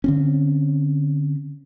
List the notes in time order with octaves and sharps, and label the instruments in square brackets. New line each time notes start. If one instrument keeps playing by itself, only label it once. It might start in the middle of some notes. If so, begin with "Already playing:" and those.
[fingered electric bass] D3 C4 C#4